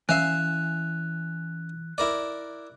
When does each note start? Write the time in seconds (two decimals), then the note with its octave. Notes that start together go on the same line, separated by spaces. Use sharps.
0.09 E3 C#4 E5 F5 F#6
1.98 E4 A#4 D5